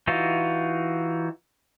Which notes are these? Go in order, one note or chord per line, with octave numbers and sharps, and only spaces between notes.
E3 D#4 F4 F#4